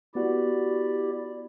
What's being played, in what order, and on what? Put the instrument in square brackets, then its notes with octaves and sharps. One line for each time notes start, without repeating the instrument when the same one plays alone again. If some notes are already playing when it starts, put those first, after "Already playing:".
[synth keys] B3 F#4 [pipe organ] E4 G4 D5